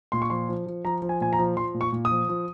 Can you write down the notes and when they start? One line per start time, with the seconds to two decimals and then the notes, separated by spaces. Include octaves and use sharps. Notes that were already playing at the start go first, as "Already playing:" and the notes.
0.12 A#2 C6
0.22 C#6
0.30 F3 C6
0.49 F3
0.66 F3
0.85 F3 A#5
1.02 F3
1.09 G#5
1.21 A#2 G#5
1.33 A#5
1.39 F3
1.57 F3 C6
1.74 A#2
1.81 C#6
1.92 A#2
2.05 D#6
2.11 F3
2.29 F3